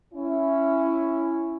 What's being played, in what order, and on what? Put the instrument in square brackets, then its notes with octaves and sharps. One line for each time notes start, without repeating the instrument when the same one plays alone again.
[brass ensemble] C#4 E4